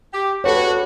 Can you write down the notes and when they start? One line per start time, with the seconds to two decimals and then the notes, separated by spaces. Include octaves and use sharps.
0.13 G4
0.44 D4 F#4 A4 B4 C#5